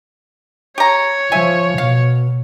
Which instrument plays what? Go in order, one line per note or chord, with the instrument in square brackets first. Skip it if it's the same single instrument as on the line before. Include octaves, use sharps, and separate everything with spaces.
[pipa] G4 A#5 [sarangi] C#5
[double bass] F3 [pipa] E5 G#5
[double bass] B2 [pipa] F5